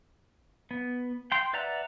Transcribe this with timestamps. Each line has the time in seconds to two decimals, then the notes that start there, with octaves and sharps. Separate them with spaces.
0.71 B3
1.32 G5 C6
1.53 B4 D5 E5 F#5 A#5